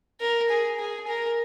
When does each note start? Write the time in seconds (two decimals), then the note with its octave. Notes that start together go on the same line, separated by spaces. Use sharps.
0.21 A#4
0.49 G#4
0.79 G#4
1.07 A#4